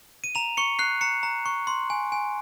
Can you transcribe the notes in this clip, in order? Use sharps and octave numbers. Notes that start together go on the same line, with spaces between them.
D#7
A#5 F7
C#6 C#7
F#6 C7
A#5 C#7
A#5
C#6
C6
G#5
G#5